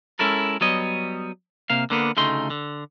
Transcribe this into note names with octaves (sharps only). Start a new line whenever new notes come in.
G#3 C#4 E4 A4 A#4
F#3 G3 B3 C#5 D#5
C3 A#3 F5
D3 A#3 B3
D2 C#3 A3 D#4 C6
D3